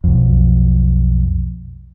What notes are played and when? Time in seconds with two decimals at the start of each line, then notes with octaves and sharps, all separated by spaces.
0.04 B1 F2